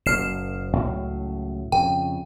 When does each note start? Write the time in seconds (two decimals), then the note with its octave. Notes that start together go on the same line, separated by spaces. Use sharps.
0.06 F#1 B2 F6 C7 E7
0.76 C#2 A2 F#3
1.72 F2 C#3 G5